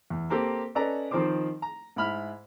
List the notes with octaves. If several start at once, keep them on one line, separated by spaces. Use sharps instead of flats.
E2
A#3 C4 G4 A4
C#4 A4 B4 D5 D#5 A#5
D#3 F3 C4 D#4 C5 D6
A#5
G#2 E4 B5 F6